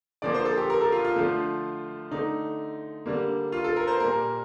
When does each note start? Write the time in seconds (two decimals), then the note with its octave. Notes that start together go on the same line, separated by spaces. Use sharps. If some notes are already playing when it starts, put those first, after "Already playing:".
0.22 D3 F3 A#3 D5
0.34 C5
0.45 A4
0.57 G4
0.70 A#4
0.81 A4
0.92 F4
1.05 F4
1.16 D3 F3 A3
2.11 D3 A3 D#4
3.06 D3 G3 A#3
3.52 F4
3.64 A4
3.76 A#4
3.88 C5
4.00 A#2 G3 A#3 A#4